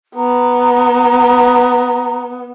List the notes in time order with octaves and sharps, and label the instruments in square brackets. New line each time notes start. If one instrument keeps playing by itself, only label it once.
[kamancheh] B3 [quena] A#5